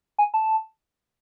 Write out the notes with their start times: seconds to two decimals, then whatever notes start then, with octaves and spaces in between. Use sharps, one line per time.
0.18 G#5
0.34 A5